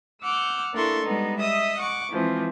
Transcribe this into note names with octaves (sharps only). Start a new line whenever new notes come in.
F#5 D6 E6 F6 G6
A#3 D4 E4 A4 C6 C#6
G3 G#3 B3 D#4
D#5 E5 D#6 E6
F#5 C#6 D6
E3 F3 G#3 C4